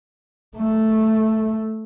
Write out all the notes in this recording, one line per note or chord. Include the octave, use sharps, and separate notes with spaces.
A3